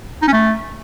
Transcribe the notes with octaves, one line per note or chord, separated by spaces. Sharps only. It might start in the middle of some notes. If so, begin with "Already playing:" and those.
D#4
C#4
A3